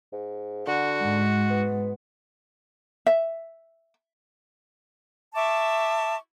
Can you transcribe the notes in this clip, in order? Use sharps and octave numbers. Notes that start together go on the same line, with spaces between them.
G#2
D3 F#4
G#2
B3
E5
E5 A5 C#6 D6